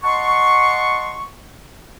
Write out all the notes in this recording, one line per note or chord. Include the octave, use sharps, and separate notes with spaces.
D#5 F#5 A5 C6 C#6